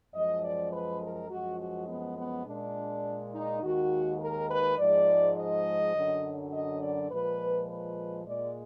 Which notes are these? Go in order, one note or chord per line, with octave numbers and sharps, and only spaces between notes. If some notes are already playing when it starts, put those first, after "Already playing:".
F#2 F3 G#3 D#5
D5
B4
A#4
F#2 F3 G#3 F#4
F#4
B3
B3
A#2 G#3 D4
D#4
D#2 D#3 G#3 F#4
A#4
B4
G#2 F3 G#3 D5
D#5
F#2 D3 F#3
D#5
D5
A#2 F3 G#3 B4
B4
A#2 G#3 D5